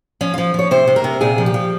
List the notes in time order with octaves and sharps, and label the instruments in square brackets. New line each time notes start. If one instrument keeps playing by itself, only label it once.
[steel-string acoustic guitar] F3 C#4
F3 F4
F3 C#5
C3 C5
C3
A#4
C3
A#2 G#4
F3
G4
F3